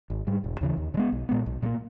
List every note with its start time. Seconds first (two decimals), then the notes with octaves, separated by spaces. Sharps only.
0.10 G#1
0.27 G#2 G3
0.44 E1
0.61 D#2 C#3 E3
0.77 D#2
0.94 C#3
0.97 G#3 B3
1.12 B1
1.29 A#2 G#3 B3
1.46 B1
1.62 A#2 G3 A#3